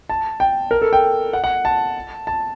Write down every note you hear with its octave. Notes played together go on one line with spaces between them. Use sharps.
A5
G5
A#4
A4
G5
F#5
F#5
A5
A5